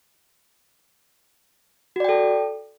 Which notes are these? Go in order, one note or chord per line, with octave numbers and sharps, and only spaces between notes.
F#4 A4 D5 G5